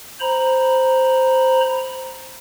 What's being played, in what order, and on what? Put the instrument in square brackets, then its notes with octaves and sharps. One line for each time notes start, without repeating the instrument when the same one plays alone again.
[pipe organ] C5 A#5 B5